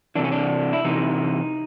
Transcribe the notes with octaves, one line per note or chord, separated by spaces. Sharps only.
C3 E3 D4
C#4
D4
E4
C3 E3 D#4